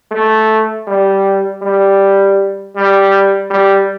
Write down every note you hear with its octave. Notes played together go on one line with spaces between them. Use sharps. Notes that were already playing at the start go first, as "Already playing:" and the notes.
A3
G3
G3
G3
G3